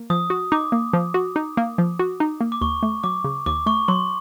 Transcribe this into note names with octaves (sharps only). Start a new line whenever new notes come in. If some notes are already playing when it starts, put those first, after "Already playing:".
Already playing: A#3
F3 D#6
F#4
D#4 D6
A#3
F3
F#4
D#4
A#3
F3
F#4
D#4
A#3
D6
D#2 C#6
A3
F#3 D6
C#3
D#2 D6
A3 C#6
F#3 C6